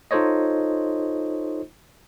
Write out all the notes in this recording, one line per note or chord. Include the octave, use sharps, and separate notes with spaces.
D#4 F4 A4 C5 C#5 D#5